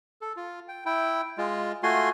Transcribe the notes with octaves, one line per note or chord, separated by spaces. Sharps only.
A4
F4
G5
E4 G5
G#3 F4
A3 F4 F#4 G#5 C6